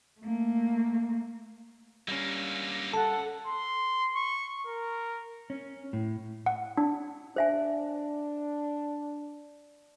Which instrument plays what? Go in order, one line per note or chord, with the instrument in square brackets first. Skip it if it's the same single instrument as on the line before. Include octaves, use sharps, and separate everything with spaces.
[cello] A3 A#3
[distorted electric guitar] D3 A#3 [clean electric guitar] G3 C#4
[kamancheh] A4 F#5 [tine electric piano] A5
[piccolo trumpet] C6
C#6
A#4
[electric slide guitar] C#4
A2
[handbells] F#5
D4
[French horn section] D4 [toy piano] C5 E5 G#5